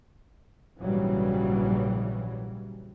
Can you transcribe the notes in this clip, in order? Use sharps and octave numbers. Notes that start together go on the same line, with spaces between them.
A#1 G#2 C#3 E3 F#3 G3